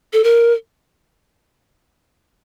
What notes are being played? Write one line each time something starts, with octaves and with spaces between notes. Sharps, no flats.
A4
A#4